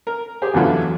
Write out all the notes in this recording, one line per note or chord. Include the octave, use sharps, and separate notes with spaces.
A#4
G4 G#4 C5
A1 E2 D3 E3 F#3 F4